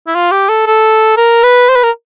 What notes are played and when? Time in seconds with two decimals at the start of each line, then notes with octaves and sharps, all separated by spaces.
0.07 E4
0.15 F4
0.32 G4
0.49 A4
0.67 A4
1.17 A#4
1.43 B4
1.69 C5
1.76 B4
1.83 A#4